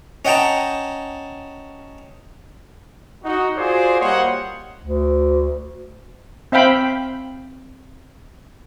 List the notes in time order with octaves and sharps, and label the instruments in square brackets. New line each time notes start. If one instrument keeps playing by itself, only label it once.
[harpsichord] C#4 D#5 F#5 G5 A5 A#5
[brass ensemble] D#4 F#4
F4 F#4 G#4 C5 D5
G3 A#3 C5 C#5 D#5 F#5
[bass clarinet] D2
[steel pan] C4 E5 F5 G5 B5